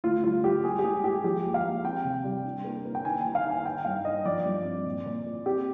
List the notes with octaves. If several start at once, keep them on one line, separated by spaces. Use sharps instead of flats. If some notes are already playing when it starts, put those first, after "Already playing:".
D2 F4
G3 F4
G3 G4
G#3 G#4
G4
G#3 G#4
G#3 G4
F3 G4
D#2
F5
D#2
C4 G5
C3
G3
D4
A#3
A#3
G5
D#3 G#5
C2 G5
F5
D#3 G#5
D#3 G5
G2 F5
D4 D#5
F3 D5
G2
C4
A#2
A#2
A#2
C4 G4